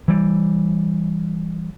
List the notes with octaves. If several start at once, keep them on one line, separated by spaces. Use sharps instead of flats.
E3 G3